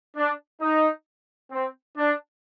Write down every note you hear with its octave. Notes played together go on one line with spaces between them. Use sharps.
D4
D#4
C4
D4